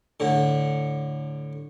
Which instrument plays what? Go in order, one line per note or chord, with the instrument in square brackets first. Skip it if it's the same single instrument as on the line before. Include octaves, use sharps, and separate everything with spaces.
[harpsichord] A2 D3